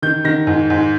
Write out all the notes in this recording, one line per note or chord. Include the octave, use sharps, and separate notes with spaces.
D#3 G6
D#3 A#6
G#2
G#2